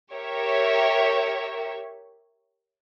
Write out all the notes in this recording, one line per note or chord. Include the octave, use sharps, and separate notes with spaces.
G4 A#4 C#5 E5